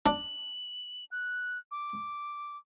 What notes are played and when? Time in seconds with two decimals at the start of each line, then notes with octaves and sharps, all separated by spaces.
0.06 D4 F#7
1.11 F#6
1.71 D6